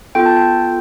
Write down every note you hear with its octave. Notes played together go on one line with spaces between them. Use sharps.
B3 F4 A4 G5
A5
G5